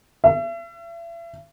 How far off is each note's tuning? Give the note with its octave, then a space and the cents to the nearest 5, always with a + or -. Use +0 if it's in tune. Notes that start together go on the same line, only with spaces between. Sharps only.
E5 +40